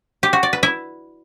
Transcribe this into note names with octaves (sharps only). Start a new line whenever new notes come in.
G4
F#4
D5
B4
E4